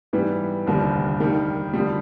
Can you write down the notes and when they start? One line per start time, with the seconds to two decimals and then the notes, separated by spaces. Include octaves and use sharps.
0.13 G#2 E3 G3 B3
0.67 F1 D#2 D3 G3 A#3
1.20 D#3 G3 A#3
1.74 F2 D3 G3